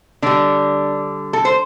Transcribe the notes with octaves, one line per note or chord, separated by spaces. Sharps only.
D3 G3 D4
A4
C5